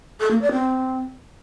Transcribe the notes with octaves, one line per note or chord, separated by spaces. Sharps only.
A4
A#3
D5
C4